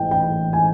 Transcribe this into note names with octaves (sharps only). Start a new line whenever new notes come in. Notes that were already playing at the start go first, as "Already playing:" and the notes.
Already playing: A1 G#2 G5
G5
G#5